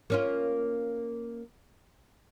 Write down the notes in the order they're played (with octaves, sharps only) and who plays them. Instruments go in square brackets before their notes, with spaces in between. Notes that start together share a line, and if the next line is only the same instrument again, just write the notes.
[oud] A#3 C#4 F4